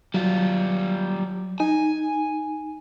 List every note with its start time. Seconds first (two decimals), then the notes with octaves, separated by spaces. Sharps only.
0.14 F#3 G3 F4
1.60 D#4 G#5